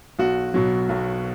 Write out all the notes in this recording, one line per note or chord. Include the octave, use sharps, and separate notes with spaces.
B1 F#4
B2 F#3
B1